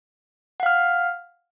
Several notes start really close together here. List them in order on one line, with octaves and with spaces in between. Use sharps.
F#5 F5 F6